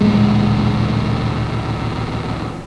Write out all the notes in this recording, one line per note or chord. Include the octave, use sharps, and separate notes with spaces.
A1 D2 A#2 G#3